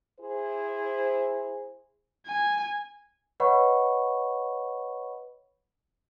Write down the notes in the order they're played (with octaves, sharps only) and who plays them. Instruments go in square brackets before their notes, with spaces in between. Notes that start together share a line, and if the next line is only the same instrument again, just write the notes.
[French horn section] E4 G#4 C5
[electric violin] G#5
[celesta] B4 C#5 D#5 F#5 B5 C#6